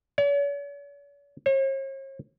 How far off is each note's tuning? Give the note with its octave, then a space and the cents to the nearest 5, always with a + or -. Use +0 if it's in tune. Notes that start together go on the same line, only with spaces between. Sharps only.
C#5 +45
C#5 -45